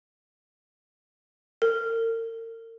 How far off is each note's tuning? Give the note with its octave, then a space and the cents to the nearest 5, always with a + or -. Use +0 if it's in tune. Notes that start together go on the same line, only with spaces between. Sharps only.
A#4 -40